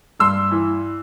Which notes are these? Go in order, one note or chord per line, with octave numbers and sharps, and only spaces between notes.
G2 C6 E6
E3